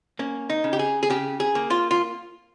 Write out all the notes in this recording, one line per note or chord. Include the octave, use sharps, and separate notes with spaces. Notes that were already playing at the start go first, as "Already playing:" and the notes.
A#3 C#4
D#4
C#3
G4
G#4
G#4
C#3 G4
G#4
A#3
F4
F4